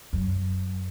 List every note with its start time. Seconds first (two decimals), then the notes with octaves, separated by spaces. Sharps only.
0.13 F#2